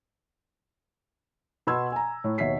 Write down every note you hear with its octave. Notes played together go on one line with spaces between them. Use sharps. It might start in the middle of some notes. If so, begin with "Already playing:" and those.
B2 B3 B5 C6 E6 G#6
G#5 A#5
A2
D#2 B2 C#5 E5 B6 C7